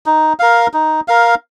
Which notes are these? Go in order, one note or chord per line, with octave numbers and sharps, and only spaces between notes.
D#4
A#4 F5
D#4
A#4 F5